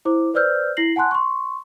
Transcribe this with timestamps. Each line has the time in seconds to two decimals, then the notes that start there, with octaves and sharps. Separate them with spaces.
0.05 E4 C5 D6
0.34 B4 C5 D5 E6 F6 G6
0.77 E4 A#6 C7 F#7
0.96 F#5 G#5 A5 C6 F#6
1.11 C6 C#6